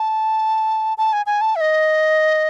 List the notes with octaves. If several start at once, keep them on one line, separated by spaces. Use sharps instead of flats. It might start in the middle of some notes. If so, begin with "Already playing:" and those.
Already playing: A5
A5
G#5
G#5
A5
E5
D#5